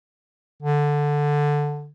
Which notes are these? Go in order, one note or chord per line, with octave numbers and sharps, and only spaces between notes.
D3